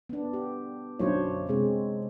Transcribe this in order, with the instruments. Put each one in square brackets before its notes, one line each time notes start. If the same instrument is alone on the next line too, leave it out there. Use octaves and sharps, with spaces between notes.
[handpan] B3 D4
G4
[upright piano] B1 F#2 D3 [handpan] D4 C5 C#5
[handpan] C3 G#3 C4 [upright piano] G#4